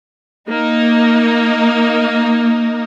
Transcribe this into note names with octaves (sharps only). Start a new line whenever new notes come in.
A#3 D#4